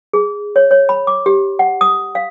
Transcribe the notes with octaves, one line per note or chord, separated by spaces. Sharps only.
G#4
C#5
C#5
B5
D6
G4
F#5
D#6
F5